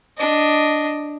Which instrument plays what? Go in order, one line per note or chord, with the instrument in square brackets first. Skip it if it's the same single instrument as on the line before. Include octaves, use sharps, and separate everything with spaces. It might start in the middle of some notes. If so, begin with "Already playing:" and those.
[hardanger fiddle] D4 D#5